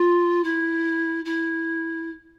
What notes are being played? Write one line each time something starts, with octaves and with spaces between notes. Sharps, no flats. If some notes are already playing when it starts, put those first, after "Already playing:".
Already playing: F4
E4
E4